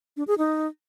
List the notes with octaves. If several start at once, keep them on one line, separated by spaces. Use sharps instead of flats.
D4
G#4
D#4